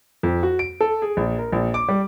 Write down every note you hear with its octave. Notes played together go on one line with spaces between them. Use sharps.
F2
F#4
D7
A4
G#4
A#1
A#4
A#1
D6
G3